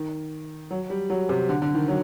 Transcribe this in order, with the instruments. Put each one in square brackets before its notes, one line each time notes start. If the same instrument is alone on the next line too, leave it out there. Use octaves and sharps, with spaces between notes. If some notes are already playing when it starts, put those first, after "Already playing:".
Already playing: [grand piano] D#3
F#3
G3
F#3
C3
D3
D3
D#3
F#3